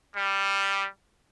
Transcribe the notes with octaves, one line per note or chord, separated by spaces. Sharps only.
G3